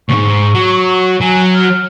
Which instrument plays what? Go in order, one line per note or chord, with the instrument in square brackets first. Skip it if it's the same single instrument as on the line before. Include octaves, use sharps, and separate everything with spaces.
[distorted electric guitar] D2 G#2 [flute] C#6
[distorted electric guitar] F#3
[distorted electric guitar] F#3 [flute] G#5
[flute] F6